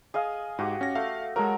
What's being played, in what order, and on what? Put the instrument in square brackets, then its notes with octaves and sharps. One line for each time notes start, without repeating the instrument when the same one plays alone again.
[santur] G#4 D#5 F5
[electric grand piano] G#2 [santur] F#4 G4
[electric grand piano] C#4 A#6
[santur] A3 [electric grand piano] F5
[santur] F#3 A4 [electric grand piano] G#3 A#4